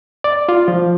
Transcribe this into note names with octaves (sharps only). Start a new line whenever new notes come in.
D5
F4
F3